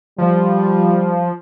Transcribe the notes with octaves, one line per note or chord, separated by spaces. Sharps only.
F3 G3